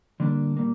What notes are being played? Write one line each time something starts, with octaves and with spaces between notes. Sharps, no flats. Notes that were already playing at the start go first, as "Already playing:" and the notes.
D3 G3 A#3 D4
A#2 G3 A#3